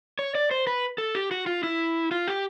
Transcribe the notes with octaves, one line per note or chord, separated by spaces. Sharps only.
C#5
D5
C5
B4
A4
G4
F#4
F4
E4
F4
G4